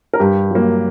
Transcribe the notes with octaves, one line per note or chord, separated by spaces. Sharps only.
A#4
G2 G4
F#3 A#3